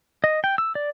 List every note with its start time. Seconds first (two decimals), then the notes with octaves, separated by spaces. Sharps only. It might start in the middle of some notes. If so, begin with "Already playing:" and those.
0.24 D#5
0.44 G5
0.58 E6
0.75 D5